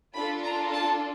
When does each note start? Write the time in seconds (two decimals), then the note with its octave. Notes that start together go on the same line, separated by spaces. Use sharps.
0.15 D4 F4 A4 B5
0.44 A#5
0.73 A5